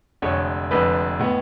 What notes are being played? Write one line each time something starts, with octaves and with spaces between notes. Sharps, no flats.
F1 F2 D3 G#3 C#5
F1 F2 D3 G#3 B4
A2 G#3 B3